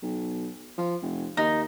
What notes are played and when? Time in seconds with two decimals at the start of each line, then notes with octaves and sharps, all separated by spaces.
0.02 B1
0.78 F3
1.02 F1
1.37 D#2 D#4